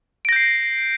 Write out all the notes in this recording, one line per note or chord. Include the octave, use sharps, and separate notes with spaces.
G6 A#6 C7 D7